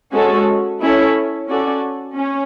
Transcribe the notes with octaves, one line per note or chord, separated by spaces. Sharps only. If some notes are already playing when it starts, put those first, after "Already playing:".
G#3 C#4 F#4 A4
C#4 E4 A4 C#5
C#4 F#4 A4 D5
C#4